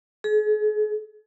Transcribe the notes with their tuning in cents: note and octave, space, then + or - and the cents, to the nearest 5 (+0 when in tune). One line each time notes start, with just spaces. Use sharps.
G#4 +40